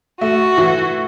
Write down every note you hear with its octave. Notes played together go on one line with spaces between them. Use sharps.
A3 F#4
E3